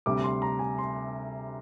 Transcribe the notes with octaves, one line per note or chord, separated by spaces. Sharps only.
D2 C3 G3 D6
C6
A#5
G#5
C6